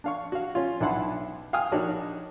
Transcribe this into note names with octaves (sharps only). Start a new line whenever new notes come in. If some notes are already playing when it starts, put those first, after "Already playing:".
D4 F5 C#6
F#4 F5
C#4 F4
B1 D4 E4 F#5 A5 C6
F5 G5 G#5 D#6 F6
A#1 D4 D#4 F#4 C#5